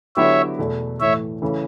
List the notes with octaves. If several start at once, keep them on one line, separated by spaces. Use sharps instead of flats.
D3 F#3 B3 E4 G4 C#5 E5
E2 B2 A3
A2 E3 A3 C#5 E5
C#3 E3 A3